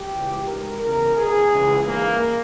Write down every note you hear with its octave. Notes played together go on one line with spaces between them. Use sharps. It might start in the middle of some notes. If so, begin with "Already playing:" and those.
Already playing: G4
C#2 C#3 E3
G#2 E3 A#4
E2 C#3 E3 A#4
E2 B2 G#4
C#2 C#3 E3
G#2 E3 A#3